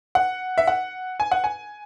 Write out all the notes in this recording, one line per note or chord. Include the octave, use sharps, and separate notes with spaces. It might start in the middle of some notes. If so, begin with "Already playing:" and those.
F#5
E5
F#5
G#5
F#5
G#5